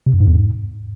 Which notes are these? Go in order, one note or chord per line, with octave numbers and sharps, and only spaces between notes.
C3
F#2
G#2
E2
G#2